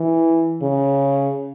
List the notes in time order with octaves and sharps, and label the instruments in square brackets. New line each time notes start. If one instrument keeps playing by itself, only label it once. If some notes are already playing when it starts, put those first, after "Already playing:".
Already playing: [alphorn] E3
C#3